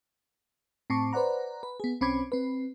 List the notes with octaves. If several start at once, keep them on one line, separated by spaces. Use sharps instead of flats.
A2 C4 A5 C#6 D6
B4 C5 D5 F#5 A#5
B4
B3 G#4
B1 C4 C#4 B5 D6 G#6
C4 B4